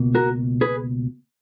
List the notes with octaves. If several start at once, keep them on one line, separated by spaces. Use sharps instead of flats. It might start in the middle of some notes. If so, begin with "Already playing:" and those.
Already playing: C#2 B2 A#3
F#4 A#4
G#4 B4